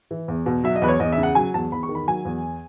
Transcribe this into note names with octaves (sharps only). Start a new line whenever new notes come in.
E3
E2
B2
F#3 E5
D#5
E2 B4
C#5
E2 D#5
E5
C#3
F#5
F#3 G#5
E2 A5
E2 B5
C#6
D#3
B5
F#3 G#5
E2